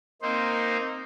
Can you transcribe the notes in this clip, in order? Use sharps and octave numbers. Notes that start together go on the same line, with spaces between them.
A#3 C4 D#4 C5